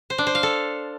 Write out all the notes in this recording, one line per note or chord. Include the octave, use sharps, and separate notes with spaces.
C5
D4
C5
F5
A4